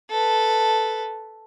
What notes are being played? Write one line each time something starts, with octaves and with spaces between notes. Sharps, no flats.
A4 B4